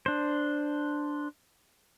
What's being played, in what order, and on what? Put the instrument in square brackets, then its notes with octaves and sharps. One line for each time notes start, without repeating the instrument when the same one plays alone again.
[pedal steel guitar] D4 C5